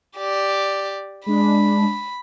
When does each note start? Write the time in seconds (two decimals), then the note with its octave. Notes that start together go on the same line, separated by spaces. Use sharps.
0.17 G4 D5
1.26 G#3 D4 B5